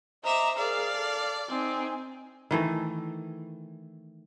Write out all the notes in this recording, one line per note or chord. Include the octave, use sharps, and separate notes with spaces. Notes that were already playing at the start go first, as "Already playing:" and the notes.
C5 D#5 E5 A#5 D6
G#4 A#4 D5 F5
A4
C4 D#4 G#5
D#3 E3 A3